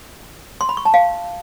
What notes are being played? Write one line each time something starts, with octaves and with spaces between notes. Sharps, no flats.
C6
B5
C#6
A5
F5